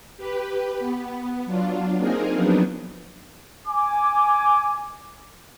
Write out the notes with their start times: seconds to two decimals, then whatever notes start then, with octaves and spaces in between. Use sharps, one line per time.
0.17 G4 B4
0.79 B3
1.46 F#3 D4 F4
1.98 A#3 C4 D#4 G#4 A#4
2.34 F3 F#3 B3 D4 D#4
3.67 G#5 D6